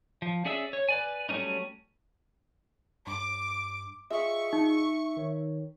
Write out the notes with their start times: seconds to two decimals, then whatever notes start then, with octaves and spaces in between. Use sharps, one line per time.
0.22 F3
0.45 C#4 G#4 D5 E5 E6
0.73 C#5
0.89 B4 D5 G#5
1.29 F#3 G3 A3 C#4 D#4
3.07 G2 D6
4.10 F4 G#4 D#5 E5 C#6
4.53 D#4
5.17 D#3 C#5